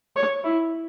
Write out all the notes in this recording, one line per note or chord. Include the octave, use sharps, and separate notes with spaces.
C#5
E4